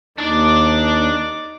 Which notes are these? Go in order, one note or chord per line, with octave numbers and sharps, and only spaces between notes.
D#2 D4 D#4 D5 D6